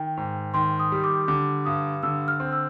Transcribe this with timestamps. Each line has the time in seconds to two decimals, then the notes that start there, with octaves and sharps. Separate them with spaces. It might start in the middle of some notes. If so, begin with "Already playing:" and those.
Already playing: D#3 G5
0.17 G#2
0.54 D#3 C6
0.80 D#6
0.92 G3
1.04 D6
1.28 D3 D6
1.65 G2 D#6
2.03 D3 E6
2.28 F6
2.40 C4
2.52 E6